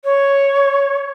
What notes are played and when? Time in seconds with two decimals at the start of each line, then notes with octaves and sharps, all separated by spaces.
0.04 C#5